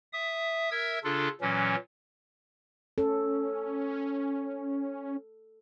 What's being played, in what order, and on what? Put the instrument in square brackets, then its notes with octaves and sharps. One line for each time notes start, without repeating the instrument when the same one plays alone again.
[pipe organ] E5 D#6
A#4 E5 E6 G#6
C#3 D4 F4 A4
A#2 E3 F#3 C#4
[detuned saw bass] C#4 [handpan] A4